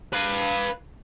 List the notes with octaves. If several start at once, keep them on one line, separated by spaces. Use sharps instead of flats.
B4 F5